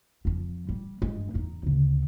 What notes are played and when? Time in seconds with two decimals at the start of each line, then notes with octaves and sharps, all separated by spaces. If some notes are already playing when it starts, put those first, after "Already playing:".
0.25 F2 F3
0.69 G3
1.02 G2 G#3
1.34 E2 D#4
1.63 D2 C#3